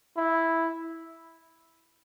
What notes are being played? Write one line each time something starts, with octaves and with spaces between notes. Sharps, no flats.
E4